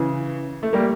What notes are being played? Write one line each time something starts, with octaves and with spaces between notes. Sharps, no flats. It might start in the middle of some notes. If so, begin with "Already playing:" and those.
Already playing: C#3 E3
A3
G3 A#3